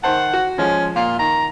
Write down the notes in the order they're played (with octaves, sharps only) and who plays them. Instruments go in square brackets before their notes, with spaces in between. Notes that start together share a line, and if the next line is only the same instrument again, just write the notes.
[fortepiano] D#3 C5 A5 [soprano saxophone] F#5
[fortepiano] F#4
[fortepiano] F3 G#3 [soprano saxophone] C#4
[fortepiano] A#2 [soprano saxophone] F4
[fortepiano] D#3 [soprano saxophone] A#5